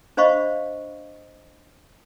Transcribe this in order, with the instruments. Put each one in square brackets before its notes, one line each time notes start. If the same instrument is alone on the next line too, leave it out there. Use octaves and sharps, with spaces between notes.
[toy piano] D4 C5 D#5 F5 B5 C#6